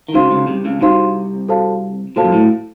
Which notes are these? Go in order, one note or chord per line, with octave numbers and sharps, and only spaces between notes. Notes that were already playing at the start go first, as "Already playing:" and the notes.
D#3
C#2 C#3 D#4 F#4 C5 F5 C6
C#2 C#3
C2 C3
C#2 C#3
C2 C3 D#4 F#4 C5 F5 C6
F#4 A4 C5 F5 A5
A#2 F#4 A4 C5 F5 A5
F#2
A2